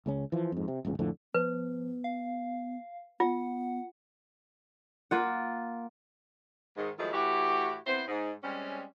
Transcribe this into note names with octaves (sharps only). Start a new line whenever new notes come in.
C#2 C#3 C#4
E3 F3
F2 G#2
C3
D1 G#1 C#2 C#3
F2 A2 D3 F3
F3 B3 B4
F5
B3 F4 F#5
A#3 F4 F#5
G#2 D#3
D#3 F3 F#3 G#3 A3 E4
A2 E3 E4 F#4 G4
B3 C4 E4 C5
G#2
G3 G#3 C4 C#4